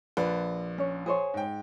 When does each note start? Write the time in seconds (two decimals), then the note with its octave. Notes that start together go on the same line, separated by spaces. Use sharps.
0.17 A#1 B4 D5
0.78 C#4 C#5
1.06 G#4 C5 C#5
1.34 G#2 G5